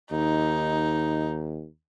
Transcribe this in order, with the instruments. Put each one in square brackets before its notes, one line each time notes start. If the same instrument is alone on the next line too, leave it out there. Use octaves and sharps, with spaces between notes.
[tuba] D#2 [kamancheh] D#4